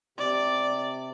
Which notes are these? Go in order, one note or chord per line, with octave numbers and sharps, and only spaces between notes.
C3 D5